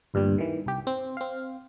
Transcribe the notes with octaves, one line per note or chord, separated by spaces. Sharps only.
D2 G2 A#2 G3
D#3 E3
C2 G4
C4
C4 F5